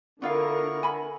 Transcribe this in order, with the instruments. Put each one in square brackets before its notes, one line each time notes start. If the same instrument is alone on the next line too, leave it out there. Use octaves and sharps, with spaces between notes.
[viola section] D3 A#4 [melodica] B3 E4 C#6 [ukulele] D4 F4 F5
[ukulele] G#5 B5